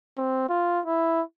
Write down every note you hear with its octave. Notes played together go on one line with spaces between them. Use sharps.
C4
F4
E4